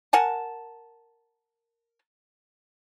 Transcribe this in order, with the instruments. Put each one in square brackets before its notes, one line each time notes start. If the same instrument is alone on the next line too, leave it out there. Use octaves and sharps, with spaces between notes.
[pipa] A#4 F#5 G#5 A5